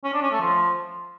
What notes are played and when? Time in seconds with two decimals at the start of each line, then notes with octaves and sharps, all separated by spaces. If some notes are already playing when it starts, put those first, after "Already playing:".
0.04 C#4
0.13 D4
0.22 C#4
0.32 A3
0.41 F3